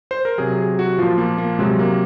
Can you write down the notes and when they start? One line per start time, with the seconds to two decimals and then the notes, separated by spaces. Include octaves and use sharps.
0.11 C5
0.25 A#4
0.38 C3 F#3 G#4
0.58 G#4
0.79 F#4
0.98 A#2 F3 F4
1.18 A#3
1.38 A#3
1.59 C3 F#3 G#3
1.79 A#3